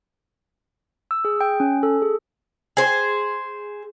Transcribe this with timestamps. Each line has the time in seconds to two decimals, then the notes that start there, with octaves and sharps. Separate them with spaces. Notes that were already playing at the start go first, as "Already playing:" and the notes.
1.11 E6
1.25 G#4
1.41 G5
1.60 C#4
1.83 A4
2.02 G#4
2.77 G#4 C5